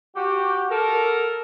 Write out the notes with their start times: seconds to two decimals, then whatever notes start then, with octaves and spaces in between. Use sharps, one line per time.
0.16 F#4 G4
0.71 A4 A#4